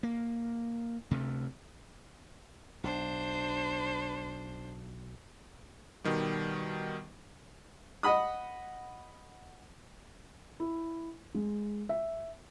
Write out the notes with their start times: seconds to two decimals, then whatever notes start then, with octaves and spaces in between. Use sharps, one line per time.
0.03 A#3
1.11 D2 C3 A3
2.84 B1 D4 C5
6.04 B2 D#3 G3
8.03 D#5 F#5 B5 D#6
10.60 E4
11.34 G#3
11.89 E5